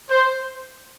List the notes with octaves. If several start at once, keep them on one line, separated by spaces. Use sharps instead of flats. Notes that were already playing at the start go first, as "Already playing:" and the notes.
C5